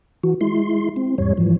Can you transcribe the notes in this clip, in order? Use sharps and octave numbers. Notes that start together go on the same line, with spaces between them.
E3 F#4
G#3 E4 C6
C4
E2 G#2 G3 C#5
G#2 E3 F3